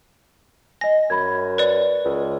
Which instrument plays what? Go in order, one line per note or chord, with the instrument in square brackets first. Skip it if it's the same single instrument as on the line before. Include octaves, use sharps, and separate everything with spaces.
[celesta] D#5 G#5 [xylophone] A#6
[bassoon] F#2 [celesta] B5 G#6
[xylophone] B4 D5
[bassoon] C#2